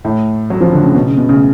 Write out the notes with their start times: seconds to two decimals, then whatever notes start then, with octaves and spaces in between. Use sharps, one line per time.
0.05 A2
0.50 F#3
0.61 F3
0.72 D3
0.83 C#3
0.95 B2
1.06 C#3
1.17 B2
1.29 C#3